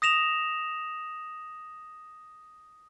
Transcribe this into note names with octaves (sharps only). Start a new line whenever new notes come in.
D#6 A#6 E7 F7